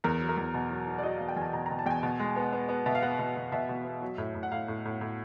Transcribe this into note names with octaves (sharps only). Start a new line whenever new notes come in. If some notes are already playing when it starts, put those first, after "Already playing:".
E2 A#4
F#3
A#4
E2
B2
F#3
F#3
D5
F#3 D#5
E2 F5
G5
E2 G#5 A5
B2 A#5
B2 A#5
A5
E2 G5 G#5
B2
G#3
B3
B3
B3
B2 E5
F5
B3 F#5
B2
B2
B2 E5
B2
B3
F#3
A2
A2
F#5
A2 F5
A2
A2
A2